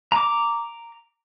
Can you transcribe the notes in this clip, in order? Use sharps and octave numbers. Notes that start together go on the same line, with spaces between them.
A#5 D6